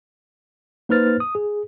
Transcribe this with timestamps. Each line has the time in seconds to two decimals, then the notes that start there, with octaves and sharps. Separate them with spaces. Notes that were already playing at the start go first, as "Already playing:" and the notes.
0.89 A#3 D#4 B4 C5 F6 A6
1.20 D#6
1.35 G#4